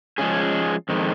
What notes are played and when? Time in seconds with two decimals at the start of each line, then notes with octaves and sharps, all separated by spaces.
0.18 F3 G#3 C#4 G#4
0.89 F2 D#3 G#3